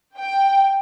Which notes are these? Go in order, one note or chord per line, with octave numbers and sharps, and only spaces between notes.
G5